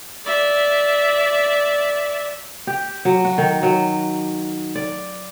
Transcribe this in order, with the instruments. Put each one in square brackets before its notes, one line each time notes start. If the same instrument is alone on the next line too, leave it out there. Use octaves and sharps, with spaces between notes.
[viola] D5 E5
[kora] G4
F#3
F#4
D#3
F#3
D5